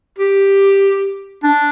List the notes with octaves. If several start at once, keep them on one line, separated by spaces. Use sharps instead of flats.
G4
D4